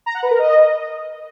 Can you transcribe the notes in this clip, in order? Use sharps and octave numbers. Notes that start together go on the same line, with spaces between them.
A#5
F#5
B4
A#4
D#5